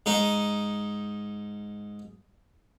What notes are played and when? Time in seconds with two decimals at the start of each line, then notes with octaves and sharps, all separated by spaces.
0.06 G#2 D#4